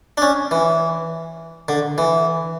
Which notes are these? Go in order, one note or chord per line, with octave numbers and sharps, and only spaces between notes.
D4
C#4
E3
D3
E3